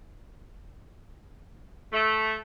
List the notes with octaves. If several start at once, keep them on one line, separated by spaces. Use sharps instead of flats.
A3